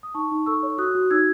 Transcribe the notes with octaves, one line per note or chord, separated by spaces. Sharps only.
D#6
D#4 A5 C#6
D#4
A4 C#6 E6
C#5
F#4 D#6 F#6
F#4
D#4 E6 G#6